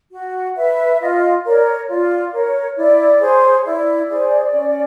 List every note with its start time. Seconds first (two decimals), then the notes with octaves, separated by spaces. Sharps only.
0.12 F#4
0.56 B4 E5
1.00 F4 D#5
1.44 A#4 C#5 D5
1.88 F4 D5
2.33 A#4 C#5
2.76 E4 D5
3.20 G#4 C5 C#5
3.38 C#5
3.64 E4 D5
4.09 G#4 C5
4.53 C#4